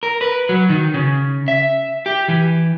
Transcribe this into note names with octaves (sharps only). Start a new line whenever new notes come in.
A#4
B4
F#3
D#3
C#3
E5
G4
E3